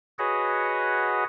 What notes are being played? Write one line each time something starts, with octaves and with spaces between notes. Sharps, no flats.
F#4 G#4 B4 C#5 D#5 F#5